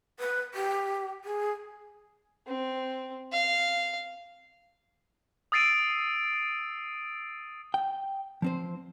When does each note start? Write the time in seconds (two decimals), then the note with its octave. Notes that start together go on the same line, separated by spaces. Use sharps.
0.19 B4
0.54 G4
1.24 G#4
2.47 C4
3.32 F5
5.52 D#6 E6 A6 C7 D7 D#7
7.74 G5
8.42 F3 C4 C5